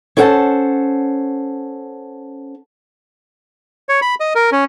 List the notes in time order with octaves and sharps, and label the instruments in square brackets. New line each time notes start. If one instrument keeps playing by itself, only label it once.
[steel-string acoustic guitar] C#4 E4 A4 C5 F#5 A5
[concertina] C#5
B5
D#5
A#4
C#4